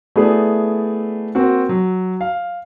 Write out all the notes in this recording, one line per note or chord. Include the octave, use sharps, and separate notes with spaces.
A3 B3 E4 G#4 D5
A#3 C4 F#4
F#3
F5